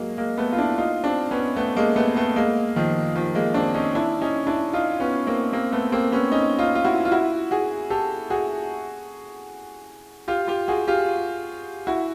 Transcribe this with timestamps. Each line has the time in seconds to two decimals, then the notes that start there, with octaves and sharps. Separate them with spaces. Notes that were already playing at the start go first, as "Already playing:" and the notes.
Already playing: F#3 G#3 A#3
0.18 G#3 A#3
0.37 A3 B3
0.53 F4
0.58 D4 E4
0.78 D#4 F4
1.04 C4 D4
1.31 B3 C#4
1.56 A3 B3
1.76 G#3 A#3
1.96 A3 B3
2.16 A3 B3
2.36 G#3 A#3
2.76 D#3 F3
3.16 D#3 F3
3.35 G#3 A#3
3.54 C4 D4
3.74 C#4 D#4
3.95 D4 E4
4.22 C#4 D#4
4.47 D4 E4
4.73 D#4 F4
5.00 B3 C#4
5.27 A#3 C4
5.53 A#3 C4
5.72 A3 B3
5.92 A#3 C4
6.12 B3 C#4
6.32 C#4 D#4
6.58 D#4 F4
6.75 F4
6.84 E4 F#4
7.05 F4
7.11 E4 F#4
7.51 F#4 G#4
7.90 G4 A4
8.30 F#4 G#4
10.28 F4 G4
10.47 F4 G4
10.68 F#4 G#4
10.88 F4 G4
11.87 E4 F#4